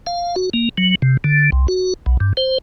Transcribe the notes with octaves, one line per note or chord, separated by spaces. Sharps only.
F5
F#4
A#3
F#3
C3
D3
C2
F#4
B1
G2
C5